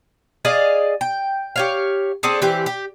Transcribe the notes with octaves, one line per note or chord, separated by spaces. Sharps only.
G#4 D5 D#5 F5
G5
G4 C#5 F5
C4 D4 G#4 A4
E3 C4 G4
G4